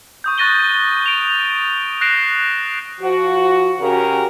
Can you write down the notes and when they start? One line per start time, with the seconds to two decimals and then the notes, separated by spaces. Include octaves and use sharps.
0.24 C#6 D#6 G6
0.38 C#6 F#6 A6 A#6 D#7 G7
0.61 A6
1.06 D7 F7
2.01 F#6 A#6 C7 D7 E7
3.00 F3 F#4
3.79 C#3 C#4 F#4 G4 A#4